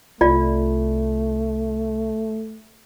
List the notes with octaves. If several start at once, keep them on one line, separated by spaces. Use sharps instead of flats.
C2 A3 F4 D5